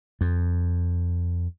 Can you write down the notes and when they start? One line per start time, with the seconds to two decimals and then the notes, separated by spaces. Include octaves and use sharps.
0.21 F2